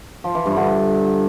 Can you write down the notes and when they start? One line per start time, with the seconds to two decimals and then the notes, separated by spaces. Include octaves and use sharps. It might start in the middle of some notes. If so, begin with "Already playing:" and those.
0.24 F3
0.35 E3
0.46 G2
0.56 D3